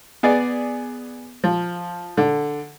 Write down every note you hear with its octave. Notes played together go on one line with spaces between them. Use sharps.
B3 G#4 D5
F3
D3